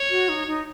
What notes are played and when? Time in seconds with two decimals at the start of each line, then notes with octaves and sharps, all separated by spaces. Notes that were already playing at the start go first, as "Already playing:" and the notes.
Already playing: C#5
0.10 F#4
0.29 D#4
0.47 D#4